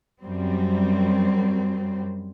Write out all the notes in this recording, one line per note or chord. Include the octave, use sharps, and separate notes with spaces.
F#2 G3 C4